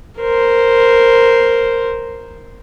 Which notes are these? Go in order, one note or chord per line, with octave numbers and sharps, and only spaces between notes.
A#4 C5